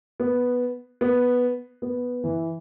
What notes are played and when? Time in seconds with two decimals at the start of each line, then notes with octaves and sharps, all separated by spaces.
0.20 B3
1.01 B3
1.82 B3
2.24 E3